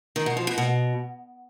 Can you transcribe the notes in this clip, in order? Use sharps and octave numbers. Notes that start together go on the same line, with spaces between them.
D#3
B2
F3
B2
B2